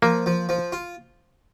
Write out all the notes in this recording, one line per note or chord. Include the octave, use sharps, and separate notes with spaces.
F3 A#3
F3
F3
F4